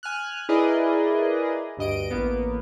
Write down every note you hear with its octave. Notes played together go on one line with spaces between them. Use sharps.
G#5 F6 F#6
E4 G#4 A#4 B4 D5 D#5
D2 G2 D#5 D7
A1 A#3 B3